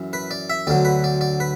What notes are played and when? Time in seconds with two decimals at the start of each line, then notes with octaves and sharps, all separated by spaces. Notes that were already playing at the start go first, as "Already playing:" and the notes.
Already playing: F#2 E3
0.13 B4
0.31 D5
0.50 E5
0.67 D2 D3 F#3 D5
0.85 B4
1.04 D5
1.21 D5
1.40 B4